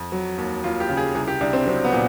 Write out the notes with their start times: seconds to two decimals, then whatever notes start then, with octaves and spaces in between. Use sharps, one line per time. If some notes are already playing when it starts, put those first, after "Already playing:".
Already playing: F2
0.12 F#3
0.38 D#2
0.64 D#2 F4
0.80 G4
0.89 C#3
0.97 G#4
1.15 C2 G#4
1.27 G4
1.41 C2 D4
1.53 C4
1.67 F#3 C4
1.84 B3
1.93 A#2